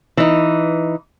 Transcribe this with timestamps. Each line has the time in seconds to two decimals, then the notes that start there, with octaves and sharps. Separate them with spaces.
0.17 E3 D#4